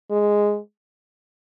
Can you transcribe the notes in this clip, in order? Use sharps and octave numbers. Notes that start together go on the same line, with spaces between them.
G#3